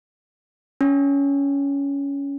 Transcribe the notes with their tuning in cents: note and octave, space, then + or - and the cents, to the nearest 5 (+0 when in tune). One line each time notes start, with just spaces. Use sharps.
C#4 +15